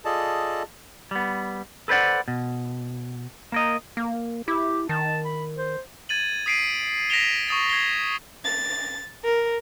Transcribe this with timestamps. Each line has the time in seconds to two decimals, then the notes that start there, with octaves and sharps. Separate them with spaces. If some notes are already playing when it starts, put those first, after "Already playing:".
0.05 F4 G#4 A4 D5 D#5 A5
1.11 G3 B3
1.88 A4 B4 C5 D5 F#5
2.28 B2
3.52 A#3 A#4 D#5
3.97 A#3
4.48 E4 G4
4.89 D#3 A5
5.25 B5
5.57 C5
6.09 G#6 A6 D#7 F#7
6.46 D#6 B6 C7 D7 D#7
7.10 A#6 B6 D7 E7 F7 G7
7.48 C#6 D#6 A6
7.70 G#6 C7 G7
8.44 A6
9.23 A#4